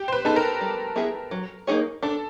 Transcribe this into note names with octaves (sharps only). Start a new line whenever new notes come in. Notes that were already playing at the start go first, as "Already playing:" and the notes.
Already playing: G4
C5
B4
B3 D#4 G#4 A4
A#4
G3
B3 E4 G#4
F#3
A#3 D#4 G#4 C#5
D4 A4